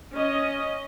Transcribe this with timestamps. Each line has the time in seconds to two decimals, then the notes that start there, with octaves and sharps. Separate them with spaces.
0.13 C#4 D#5